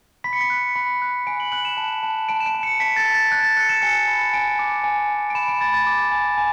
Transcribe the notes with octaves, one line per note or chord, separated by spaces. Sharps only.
B5 B6
C#7
B6
F#6
B5
F#6
G#5 D7
F#7
F#6 F#7
E7
A5
A5
A5 D7
E7
D7
A5
C#7
A5 B6
A6
A5
A6
F#6 G#6
A6
F#6 C#7
E7
G#5 C#7
B5
G#5 D7
D6
G#5
G#5
D7
B5 E7
D7
B5 A6
A6
D6
G#5
G#5